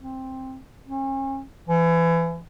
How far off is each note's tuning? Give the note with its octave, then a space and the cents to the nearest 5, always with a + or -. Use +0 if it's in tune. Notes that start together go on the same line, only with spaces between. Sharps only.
C4 +5
C#4 -40
E3 +30